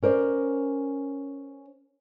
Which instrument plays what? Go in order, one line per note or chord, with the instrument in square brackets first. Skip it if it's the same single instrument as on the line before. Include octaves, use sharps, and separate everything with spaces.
[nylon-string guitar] C#4 A#4 C5 D5